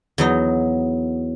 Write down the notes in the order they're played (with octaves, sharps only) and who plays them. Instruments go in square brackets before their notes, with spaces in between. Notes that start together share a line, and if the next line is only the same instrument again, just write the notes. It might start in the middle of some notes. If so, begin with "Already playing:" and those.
[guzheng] E2 F#3 D#4